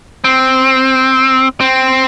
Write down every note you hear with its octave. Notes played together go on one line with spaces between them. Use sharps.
C4
C4